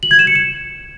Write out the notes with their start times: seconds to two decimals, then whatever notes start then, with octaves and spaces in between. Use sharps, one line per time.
0.03 F#7
0.11 G#6
0.19 E7
0.27 C#7
0.35 E7